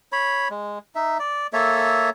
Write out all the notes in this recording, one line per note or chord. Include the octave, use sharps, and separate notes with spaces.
C#5 B5
G#3
D#4 E5
D5
A#3 A4 C#5 E5